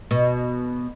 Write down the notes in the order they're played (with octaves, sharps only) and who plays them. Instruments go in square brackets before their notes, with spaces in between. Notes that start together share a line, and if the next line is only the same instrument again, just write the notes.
[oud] B2